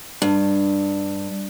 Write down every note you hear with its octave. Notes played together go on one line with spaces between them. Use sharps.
G2